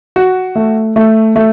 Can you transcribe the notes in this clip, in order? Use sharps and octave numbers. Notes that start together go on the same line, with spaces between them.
F#4
A3
A3
A3